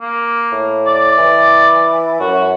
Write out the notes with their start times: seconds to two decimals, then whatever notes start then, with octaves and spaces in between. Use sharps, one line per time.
0.01 A#3
0.52 A2
0.86 D5
1.17 E3
2.20 F#2 F#4